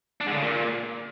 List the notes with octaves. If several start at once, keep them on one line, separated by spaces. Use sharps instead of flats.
D4
G#2
D3
C#3
A#2